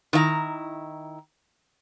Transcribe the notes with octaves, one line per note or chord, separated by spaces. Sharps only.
D#3 E4 E5 A#5